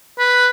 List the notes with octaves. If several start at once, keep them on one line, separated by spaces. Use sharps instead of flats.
B4